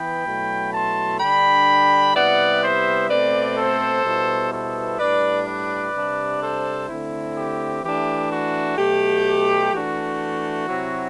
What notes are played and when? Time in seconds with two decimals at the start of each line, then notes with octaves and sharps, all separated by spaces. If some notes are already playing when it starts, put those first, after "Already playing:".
Already playing: E3 B3 G5 B5
0.25 B2 F#3 A3 E4
0.73 A5 C6
1.19 D3 G3 D4 G5 B5
2.15 C3 G3 B3 E4 D5 F#5
2.62 C5 E5
3.09 B2 A3 C4 B4 D5
3.57 A4 C5
4.04 B2 G3 B3 E4
4.51 A4 C5
4.98 A2 G3 D4 B4 D5
5.46 B4 D5
5.94 C3 G3 D4
6.41 A4 C5
6.88 D3 A3 C4 E4
7.35 G4
7.83 E3 A3 D4 G4
8.31 F#4
8.77 B2 F#3 A3 G4
9.72 E3 A3 D4 F#4
10.67 C3 F#3 C4 E4